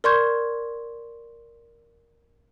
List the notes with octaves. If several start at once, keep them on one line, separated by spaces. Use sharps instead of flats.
A#4 D5 C6 C#6 G6 G#6